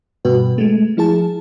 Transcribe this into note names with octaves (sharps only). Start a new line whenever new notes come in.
G2 B2 F#4 B4
G#3 A3
F3 E4 G#4 A5